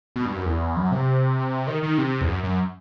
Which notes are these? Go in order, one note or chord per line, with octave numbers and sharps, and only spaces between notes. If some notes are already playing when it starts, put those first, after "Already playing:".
B2
G2
F#2
E2
F#2
C3
D#3
D#3
C3
E2
F#2
F#2